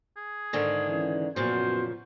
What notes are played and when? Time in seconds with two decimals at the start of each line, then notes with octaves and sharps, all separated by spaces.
0.17 G#4
0.53 G#2 D3 D#3
0.87 E3 C#4
1.36 F#2 A#2 C#3 F3 B3 F#4 C5